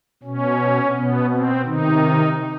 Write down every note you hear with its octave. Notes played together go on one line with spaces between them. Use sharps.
B2 C#4
B2 B3
C4
C3 D#3 D#4